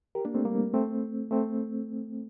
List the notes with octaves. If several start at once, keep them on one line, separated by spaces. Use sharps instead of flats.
G4 A#4
A#3 D4
A3 C4
G3 A#3
A3 C4
A3 C4